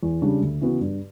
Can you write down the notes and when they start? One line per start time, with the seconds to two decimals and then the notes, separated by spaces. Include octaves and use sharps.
0.03 E2
0.22 C#3 G3 D4
0.41 D2
0.61 C#3 E3 B3 F#4
0.81 G2